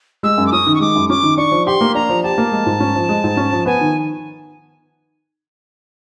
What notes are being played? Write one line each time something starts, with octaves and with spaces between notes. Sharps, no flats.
G#3 E6
F#2
D6
C#4 D#6
D#3
C#6
G#3 D6
F#2
C#4 D6
D#3
D4 C#6
F3
G4 C6
A#3
D4 A#5
F3
G4 A5
A#3
G#3
G#2
C#4
F3
G#3
G#2
C#4
F3
B3 G#5
D#3